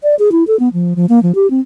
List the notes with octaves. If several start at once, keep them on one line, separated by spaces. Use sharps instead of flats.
D5
G#4
E4
A4
B3
F3
F3
A#3
F3
G4
C4